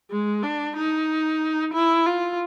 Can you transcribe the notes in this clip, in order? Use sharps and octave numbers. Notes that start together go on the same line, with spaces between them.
G#3
D4
D#4
E4
F4